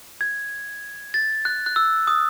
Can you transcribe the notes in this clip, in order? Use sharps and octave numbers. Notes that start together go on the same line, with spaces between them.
G#6
A6
F#6
F#6
E6
D#6